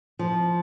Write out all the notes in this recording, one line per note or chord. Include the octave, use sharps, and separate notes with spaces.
F3